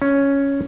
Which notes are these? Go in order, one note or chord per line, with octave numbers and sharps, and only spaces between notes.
C#4